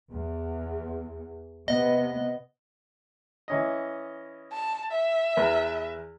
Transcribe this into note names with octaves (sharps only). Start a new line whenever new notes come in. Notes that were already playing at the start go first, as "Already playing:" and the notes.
E2
C3 B3 D#5
E3 C#4 D#5
A5
E5
E2 A#4 B4